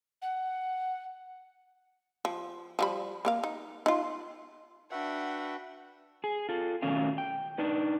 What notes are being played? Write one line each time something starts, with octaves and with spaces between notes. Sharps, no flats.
F#5
F3
F3 G3 B5
A#3 A#4 F5
D#4
D#4 F4
D4 F#4 B4 E5 F#5 G5
G#4
F4 A4
B2 D#3 F#3 A3 C#4 F5
G5
D4 D#4 B4